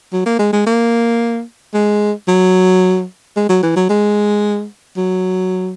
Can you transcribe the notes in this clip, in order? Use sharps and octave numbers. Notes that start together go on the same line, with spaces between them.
F#3
A#3
G#3
G#3
A#3
G#3
F#3
G#3
F#3
E3
F#3
G#3
F#3